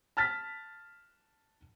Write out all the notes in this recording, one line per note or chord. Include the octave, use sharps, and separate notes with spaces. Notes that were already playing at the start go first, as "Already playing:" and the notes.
A5 F6 A6 B6